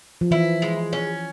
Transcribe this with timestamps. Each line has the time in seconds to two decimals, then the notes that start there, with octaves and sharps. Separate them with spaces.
0.21 F3
0.31 E3 E4
0.62 G#3
0.93 C#4